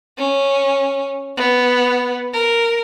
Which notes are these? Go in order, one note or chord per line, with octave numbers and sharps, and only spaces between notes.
C#4
B3
A#4